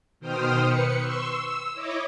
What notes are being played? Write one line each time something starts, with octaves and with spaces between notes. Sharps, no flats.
B2 D#3 C5 G5 D#6 F6
B4 C#7
C6 C#6 E6
E6
E4 C#5 D#5 D6